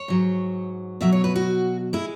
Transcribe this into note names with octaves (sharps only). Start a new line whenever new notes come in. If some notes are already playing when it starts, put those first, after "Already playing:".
Already playing: C#5
G#2 F#3
B2 F#3 E5
C#5
B4
F#4
G#3 E4